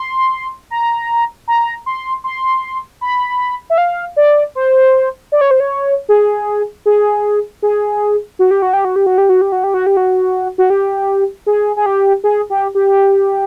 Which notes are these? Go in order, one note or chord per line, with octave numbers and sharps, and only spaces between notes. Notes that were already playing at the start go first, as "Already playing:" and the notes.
Already playing: C6
A#5
A#5
C6
C6
B5
E5
F5
D5
C5
D5
C#5
C5
C#5
G#4
G#4
G#4
F#4
G4
F#4
G4
F#4
G4
F#4
G4
F#4
G4
F#4
G4
F#4
G4
F#4
F#4
G4
G#4
G#4
G4
G#4
G4
G4